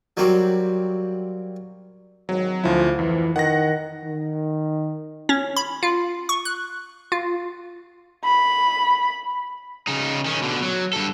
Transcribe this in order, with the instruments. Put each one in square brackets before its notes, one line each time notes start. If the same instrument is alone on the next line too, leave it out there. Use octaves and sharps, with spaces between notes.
[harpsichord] F#3 G3 A#3 C4 F#4
[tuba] G#1 [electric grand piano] F#3
[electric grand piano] D2 E4 [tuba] F3
[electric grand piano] F2 [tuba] E3
[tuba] D#3 [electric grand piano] F#5 A#6
[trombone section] D#3
[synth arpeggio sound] C#4
B5
F4
C#6
F#6
F4
[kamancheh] B5
[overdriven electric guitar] C#3 D#4
D#3 C#4
B2 D3
F#3
G2 A4